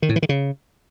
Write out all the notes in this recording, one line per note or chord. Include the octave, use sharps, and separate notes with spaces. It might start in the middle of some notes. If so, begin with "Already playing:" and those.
D#3
A2
E3
D#3
C#3